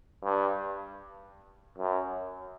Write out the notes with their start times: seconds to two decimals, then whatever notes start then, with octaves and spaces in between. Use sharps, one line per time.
0.23 G2
1.78 F#2